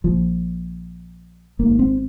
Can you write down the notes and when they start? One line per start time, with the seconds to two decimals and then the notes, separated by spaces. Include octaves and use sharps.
0.04 A#1 A#2 F3
1.59 G#1 G#2 A#3
1.79 C4